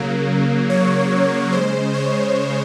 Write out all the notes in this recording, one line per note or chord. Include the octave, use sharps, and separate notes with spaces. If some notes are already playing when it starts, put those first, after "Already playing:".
Already playing: C#3 F#3 A#3
C#5
C#3 G#3 C5
C#5